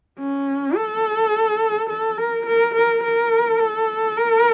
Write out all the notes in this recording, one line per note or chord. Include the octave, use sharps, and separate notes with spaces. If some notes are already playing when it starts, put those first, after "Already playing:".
C#4
A4
A4
A#4
A#4
A#4
A#4
A4
A#4